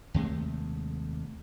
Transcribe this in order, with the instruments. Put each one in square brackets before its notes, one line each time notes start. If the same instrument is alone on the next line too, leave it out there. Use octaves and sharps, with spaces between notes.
[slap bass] D#2 C3 G#3 A3